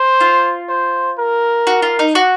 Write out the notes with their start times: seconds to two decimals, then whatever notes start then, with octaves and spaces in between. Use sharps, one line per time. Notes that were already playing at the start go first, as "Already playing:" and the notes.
Already playing: C5
0.20 F4
0.69 C5
1.18 A#4
1.67 F#4
1.82 F4
1.99 D#4
2.15 F#4